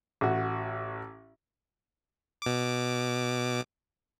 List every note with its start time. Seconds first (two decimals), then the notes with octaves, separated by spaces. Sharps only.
0.21 A1 F#4
2.42 B2 D6